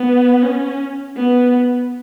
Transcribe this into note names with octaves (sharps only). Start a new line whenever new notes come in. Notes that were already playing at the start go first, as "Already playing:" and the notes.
Already playing: B3
C#4
B3